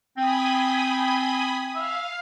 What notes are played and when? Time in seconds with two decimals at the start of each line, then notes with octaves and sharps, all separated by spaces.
0.17 C4 G5 G#5 B5 D#6
1.75 E5 F5